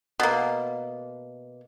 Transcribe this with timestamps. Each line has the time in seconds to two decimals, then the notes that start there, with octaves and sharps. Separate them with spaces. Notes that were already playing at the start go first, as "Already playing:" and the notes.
0.20 B2 A#3